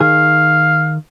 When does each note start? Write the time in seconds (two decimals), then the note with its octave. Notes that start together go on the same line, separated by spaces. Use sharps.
0.01 D#3 G#4 F5